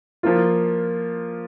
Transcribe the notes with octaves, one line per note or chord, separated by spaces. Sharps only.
F3 A#3 F4